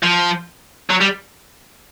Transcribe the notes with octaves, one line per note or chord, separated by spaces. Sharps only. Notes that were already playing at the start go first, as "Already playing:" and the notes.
F3
F#3
G3